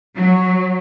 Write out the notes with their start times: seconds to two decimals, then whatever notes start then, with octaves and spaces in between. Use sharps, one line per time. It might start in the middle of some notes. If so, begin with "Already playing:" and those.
0.16 F#3